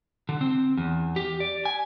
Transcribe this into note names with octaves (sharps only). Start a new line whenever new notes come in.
D3
C4
E2
G4
D5
G#5